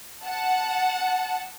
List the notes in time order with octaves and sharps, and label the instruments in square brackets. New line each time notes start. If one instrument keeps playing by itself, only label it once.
[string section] F#5 A5